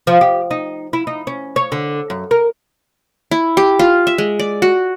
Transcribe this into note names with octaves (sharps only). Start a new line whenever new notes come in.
F3
G4
D#4
E4
D#4
C#4
C#5
D3
F#2
A#4
E4
G4
F4
E5
G#3
D5
F#4